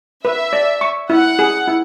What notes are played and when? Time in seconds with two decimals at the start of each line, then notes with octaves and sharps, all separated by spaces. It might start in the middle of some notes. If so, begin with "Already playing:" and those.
0.25 B4 E5
0.53 D5
0.81 C#6
1.10 E4 F#5
1.39 G#4
1.68 E4